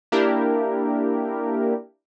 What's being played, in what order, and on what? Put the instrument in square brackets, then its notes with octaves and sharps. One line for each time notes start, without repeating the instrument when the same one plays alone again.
[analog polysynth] A#3 D4 E4 G4 A#4